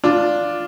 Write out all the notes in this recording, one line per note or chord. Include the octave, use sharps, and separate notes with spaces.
D4 F4